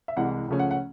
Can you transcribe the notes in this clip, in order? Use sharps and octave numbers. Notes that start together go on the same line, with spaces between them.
E5
C2 C3 E3 G#3 F#5
C#2 C#3 F3 A3 C#4
F#5
F#5